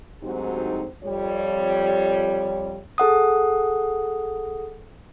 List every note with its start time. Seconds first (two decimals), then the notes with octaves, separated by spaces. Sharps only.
0.21 D2 G#2 F#3 C4 D#4 G4
1.03 F2 G3 C#5
2.98 G#4 A4 F#5 D#6